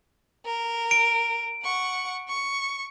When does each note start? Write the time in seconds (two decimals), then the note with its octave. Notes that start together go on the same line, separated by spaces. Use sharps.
0.45 A#4
0.91 D7
1.63 F#5 C#6
2.28 C#6